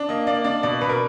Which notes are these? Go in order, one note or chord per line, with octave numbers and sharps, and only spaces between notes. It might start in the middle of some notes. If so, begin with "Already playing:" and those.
Already playing: D4
A#3 D#5
A#3 D5
D4 D5
B2 D5
B2 B4
A#4